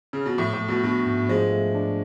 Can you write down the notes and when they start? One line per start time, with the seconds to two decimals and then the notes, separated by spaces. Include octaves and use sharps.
0.13 C#3
0.26 B2
0.38 A2 F3
0.53 A2
0.61 A3
0.68 B2
0.83 B2 D4
1.06 G#2
1.29 F3 G#3
1.52 A3
1.75 D4